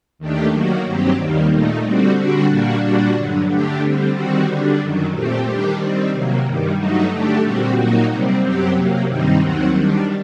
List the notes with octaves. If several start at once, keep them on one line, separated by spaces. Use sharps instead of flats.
D#2 D#3 A3 D4 G4
D#3 F#3 A#3 F#4
G2 F#3 C4 G4
D#2 D#3 G3 A#3
A#2 A3 D#4
D3 G3 C4 F#4
D3 G3 D4 F#4
A#2 G3 A#3 D4 F#4
A#2 G3 D4 F#4
G2 D3 F#3
D3 A3 D4 G4
D3 G3 C4
D#3 G3 C4 F#4
D3 G3 D4
F#2 D#3 F#3
A#2 A3 C4 G4
D#3 G3 D4 G4
D#3 G3 C4
C3 F#3 A#3
G2 D#3 G3
G2 F#3 A3 D#4 F#4
D3 A3 D4 G4
A#2 G3 C4 F#4
A#2 F#3 A#3 D#4 F#4
C3 G3 C4
F#2 F#3 C4 G4
C3 F#3 A#3
G2 D#3 G3 C4 D#4
D#2 D#3 F#3 C4 F#4
D#3 G3 D4